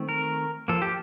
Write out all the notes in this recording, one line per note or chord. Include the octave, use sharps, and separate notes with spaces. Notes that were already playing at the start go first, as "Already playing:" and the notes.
Already playing: D#3 A3 C4
A#4
F3 A#3 A4
G4